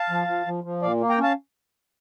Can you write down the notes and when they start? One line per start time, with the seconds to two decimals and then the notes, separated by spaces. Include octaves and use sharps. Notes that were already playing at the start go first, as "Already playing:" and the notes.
Already playing: F5 A5
0.10 F3
0.27 F3
0.46 F3
0.64 F3
0.82 A#2 D5 F5
1.00 A#3
1.09 G5 A#5
1.18 C#4 F5 A5